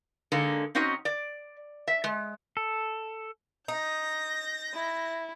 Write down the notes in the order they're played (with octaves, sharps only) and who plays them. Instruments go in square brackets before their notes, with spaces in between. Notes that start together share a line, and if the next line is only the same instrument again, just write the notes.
[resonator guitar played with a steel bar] D3 G#3 A#3 D#4
C4 C#4 D#4 F#4 D#5
D5
E5
G#3
[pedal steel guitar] A4
[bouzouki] D#4 [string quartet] G6 A#6
[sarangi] E4